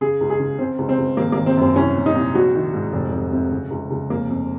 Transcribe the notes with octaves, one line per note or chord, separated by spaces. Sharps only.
C#3 G#4
C#2
G#4
C#3
C#3 C4
C#2
C4
C#2
G#1 A#3
G#1 A#3
C4
F#2 C4
C2 C#4
A#2
D#4
C2
A#1 F#4
D#3
G#2
F1
F1
C3
C#3
C#2
C#2
F1 A#3
F2